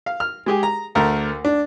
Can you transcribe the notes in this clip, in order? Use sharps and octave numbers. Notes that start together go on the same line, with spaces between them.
F5
F6
G#3 G4 G#4
A#5
D2 A3 A#4 A#5
D4